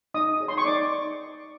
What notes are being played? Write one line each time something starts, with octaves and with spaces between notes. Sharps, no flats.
D#4 D#5 D#6
G#4 C#5
C6
C#6
D#4 D5 D6